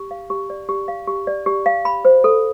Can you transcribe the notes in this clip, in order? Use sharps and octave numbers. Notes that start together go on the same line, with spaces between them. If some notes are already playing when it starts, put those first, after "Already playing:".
Already playing: G4
F5
G4
D5
G4
F5
G4
D5
G4
F5
B5
C5
A4